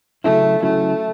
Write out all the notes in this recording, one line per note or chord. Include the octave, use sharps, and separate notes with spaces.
C#3 F#3 A3 C#4 E4
C#3 F#3 A3 C#4 E4